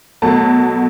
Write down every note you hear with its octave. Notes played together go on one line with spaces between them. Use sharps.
B2 F#3 A3 A5